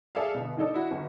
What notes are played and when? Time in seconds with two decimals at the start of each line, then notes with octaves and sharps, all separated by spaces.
0.15 G#4 A4 D5 E5 F5
0.34 G1 B2
0.57 D#3 D4 D#4 A4 D5
0.74 E4 F#4
0.91 G1